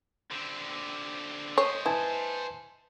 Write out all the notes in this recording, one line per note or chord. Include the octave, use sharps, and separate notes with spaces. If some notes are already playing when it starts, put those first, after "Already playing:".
D3 C4
C5 C#5 D#5
E4 B4 G#5 A5